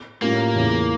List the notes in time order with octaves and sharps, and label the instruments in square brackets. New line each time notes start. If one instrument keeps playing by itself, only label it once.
[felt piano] A2 G3 C#4 F4 [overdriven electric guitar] A#3
[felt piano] E2 C#3 E3